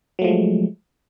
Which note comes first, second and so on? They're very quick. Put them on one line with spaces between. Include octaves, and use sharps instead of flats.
F#3 A3 F3 G#3